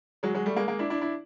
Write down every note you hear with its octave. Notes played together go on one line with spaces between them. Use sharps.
F#3 G#3
F#3 G#3
G3 A3
G#3 A#3
G#3 A#3
D4 E4
D4 E4
D4 E4